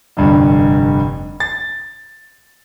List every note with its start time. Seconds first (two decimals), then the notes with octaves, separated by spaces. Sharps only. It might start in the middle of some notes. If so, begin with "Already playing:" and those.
0.17 F1 G2 D3
1.40 A6